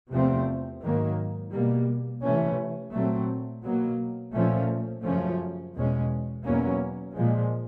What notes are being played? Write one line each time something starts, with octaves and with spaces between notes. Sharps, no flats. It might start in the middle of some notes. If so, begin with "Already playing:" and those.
E2 C3 F3 A3 C4
G#2 D#3 F#3 A#3
B2 G3 A#3
C3 E3 A3 C#4
A#2 F#3 A3 C4
B2 F#3 A#3
A#2 F3 A3 C#4
F#2 C#3 F3 A3 C#4
E2 B2 G#3 C#4
E2 B2 F#3 A#3 C#4
A#2 F3 G#3